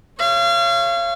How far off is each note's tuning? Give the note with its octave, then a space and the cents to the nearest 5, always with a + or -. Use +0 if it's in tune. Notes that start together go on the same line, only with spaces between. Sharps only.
C#5 -20 F5 -35